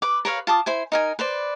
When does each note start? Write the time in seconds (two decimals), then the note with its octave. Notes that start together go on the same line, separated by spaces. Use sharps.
0.02 B4 D6
0.25 A#4 B4 C#5 F5
0.47 F4 A5 D6 D#6
0.66 E4 C5 G#5
0.92 D#4 A#4 G#5
1.19 B4 C5 D5